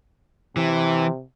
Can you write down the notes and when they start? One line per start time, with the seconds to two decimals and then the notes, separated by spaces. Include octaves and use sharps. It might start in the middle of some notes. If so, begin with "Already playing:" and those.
0.57 C3 E3